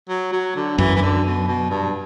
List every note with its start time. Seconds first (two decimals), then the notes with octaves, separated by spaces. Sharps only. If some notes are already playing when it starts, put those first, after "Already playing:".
0.09 F#3
0.33 F#3
0.56 D3
0.78 F#2 E3
0.96 E3
1.02 D3
1.25 B2
1.48 B2
1.70 G2